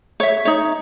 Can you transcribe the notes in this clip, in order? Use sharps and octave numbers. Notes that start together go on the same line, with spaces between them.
C#5 E5
D#4 C#5